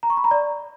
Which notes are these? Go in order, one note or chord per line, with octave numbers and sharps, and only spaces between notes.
A#5
C#6
B5
A#5
D5